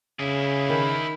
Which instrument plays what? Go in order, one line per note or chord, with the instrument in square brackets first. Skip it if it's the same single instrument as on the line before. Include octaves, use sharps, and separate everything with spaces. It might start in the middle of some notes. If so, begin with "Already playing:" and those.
[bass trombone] C#3 [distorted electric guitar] E4 G#4
[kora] D#3 [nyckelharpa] B5